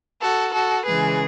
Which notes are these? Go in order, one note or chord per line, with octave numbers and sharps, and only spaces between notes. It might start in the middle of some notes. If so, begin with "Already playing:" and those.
F#4 A4
F#4 A4
C#3 E3 G#3 G#4 B4